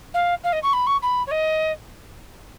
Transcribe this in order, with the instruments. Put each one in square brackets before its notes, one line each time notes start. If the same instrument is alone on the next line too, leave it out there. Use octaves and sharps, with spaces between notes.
[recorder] F5
F5
D#5
C#6
B5
C#6
B5
C#5
D#5